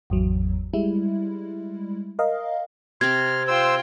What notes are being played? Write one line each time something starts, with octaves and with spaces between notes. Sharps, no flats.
G#1 E2 F#3
G3 G#3 E4
A#4 D#5 F5
C3 C4 C6 F6 G#6
F4 C5 G5 E6